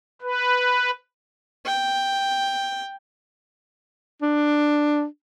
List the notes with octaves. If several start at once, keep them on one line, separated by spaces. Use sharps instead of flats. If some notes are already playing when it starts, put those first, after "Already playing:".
B4
G5
D4